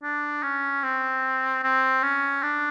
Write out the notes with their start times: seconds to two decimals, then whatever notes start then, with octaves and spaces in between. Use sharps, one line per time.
0.03 D4
0.43 C#4
0.83 C4
1.63 C4
2.03 C#4
2.43 D4